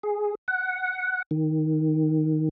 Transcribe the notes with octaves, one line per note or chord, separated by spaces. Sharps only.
G#4
F#5
D#3